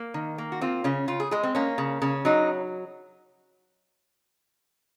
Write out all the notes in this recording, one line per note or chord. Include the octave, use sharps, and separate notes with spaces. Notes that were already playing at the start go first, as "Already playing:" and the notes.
Already playing: A#3
D#3
A#3
F#4
C4 F4
C#3 C#4
C#3 F4
G#4
G#3 G#4
C4
A#3 C#4
C#3
C#3 C#4
F#3 D#4